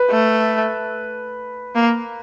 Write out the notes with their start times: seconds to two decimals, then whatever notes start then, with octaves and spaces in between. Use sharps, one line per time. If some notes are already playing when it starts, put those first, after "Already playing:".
Already playing: B4
0.10 A3
1.75 A#3